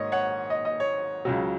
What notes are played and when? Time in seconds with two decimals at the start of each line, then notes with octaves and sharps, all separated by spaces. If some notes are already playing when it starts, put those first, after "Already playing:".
Already playing: G#1 G#2 D#3 C#5 D#5
0.12 C#5 F#5
0.50 D#5
0.65 D#5
0.80 C#5
1.25 C#2 C#3 F#3